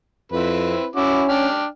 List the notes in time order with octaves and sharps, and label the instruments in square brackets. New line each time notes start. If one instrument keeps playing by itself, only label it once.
[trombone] F2 [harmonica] C4 E4 B4
[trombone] C#4 [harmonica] E4 F#4 D6
[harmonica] D4 G5 F6